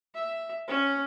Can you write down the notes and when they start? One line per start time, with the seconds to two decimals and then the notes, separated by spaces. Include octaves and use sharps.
0.14 E5
0.68 C#4